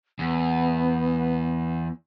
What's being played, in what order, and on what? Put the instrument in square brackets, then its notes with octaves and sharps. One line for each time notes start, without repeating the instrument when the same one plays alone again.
[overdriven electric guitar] E2 [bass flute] B3